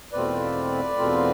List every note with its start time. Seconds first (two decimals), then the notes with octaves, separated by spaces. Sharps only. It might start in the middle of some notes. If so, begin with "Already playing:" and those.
0.13 E2 B2 A3 C4 F4 B4 D5
0.97 E2 B2 A3 C4 F4